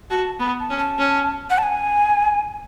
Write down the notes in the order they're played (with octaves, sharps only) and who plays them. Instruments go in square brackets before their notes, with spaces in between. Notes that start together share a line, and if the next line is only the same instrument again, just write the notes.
[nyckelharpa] F#4 [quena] A5
[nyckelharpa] B3 [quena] B5
[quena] A5
[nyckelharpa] C#4
[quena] A5
[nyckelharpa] C#4
[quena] F#5
A5
G#5